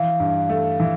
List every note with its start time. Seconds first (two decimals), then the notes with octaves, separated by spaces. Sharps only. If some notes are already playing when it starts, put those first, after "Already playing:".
Already playing: E3 F5
0.20 G2
0.49 A3
0.80 E3